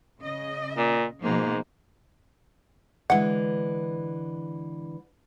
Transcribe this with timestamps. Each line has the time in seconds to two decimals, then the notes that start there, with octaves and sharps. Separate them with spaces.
0.22 C#3 D#5
0.77 A#2
1.23 G#2 B2 F3 A#3
3.10 D3 E3 G#3 E4 F#5